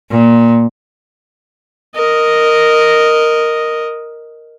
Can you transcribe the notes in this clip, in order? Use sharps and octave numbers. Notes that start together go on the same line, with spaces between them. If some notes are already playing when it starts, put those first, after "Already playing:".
A#2
A#4 D#5